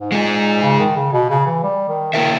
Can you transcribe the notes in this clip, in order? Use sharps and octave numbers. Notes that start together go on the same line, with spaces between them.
G#2
A#2 G#3 D#4 G#4
C#3
D#3
C#3
B2
C#3
E3
G3
D#3
D#3 A#3 E4 A#4 E5